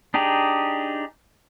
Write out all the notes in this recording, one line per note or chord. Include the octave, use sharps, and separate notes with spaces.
D4 D#4 G4 G#4